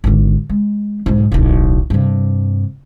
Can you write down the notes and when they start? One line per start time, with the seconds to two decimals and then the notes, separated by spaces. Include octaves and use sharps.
0.04 G#1 D3
0.49 G#3
1.06 B1 G#2
1.32 D1 B1
1.90 G2 C3